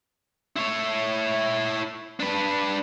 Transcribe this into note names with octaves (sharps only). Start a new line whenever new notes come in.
E4 C#5
D4 B4